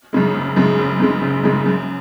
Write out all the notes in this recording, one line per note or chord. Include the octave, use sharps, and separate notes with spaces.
F#2 C#3 G#3
F#1
F#2 C#3 G#3
F#1
F#2 C#3 G#3
F#1
F#2 C#3 G#3
F#2